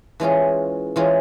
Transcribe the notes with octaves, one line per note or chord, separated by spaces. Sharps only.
E3 G#3 C#4 F4 G#4
E3 G#3 C#4 F4 G#4